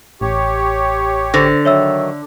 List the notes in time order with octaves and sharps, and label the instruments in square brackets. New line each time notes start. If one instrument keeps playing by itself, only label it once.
[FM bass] A1 [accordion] G4 C#5
[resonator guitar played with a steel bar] D3 [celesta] C5 A#6
[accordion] D#3 F#3 [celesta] C#5 E5 E6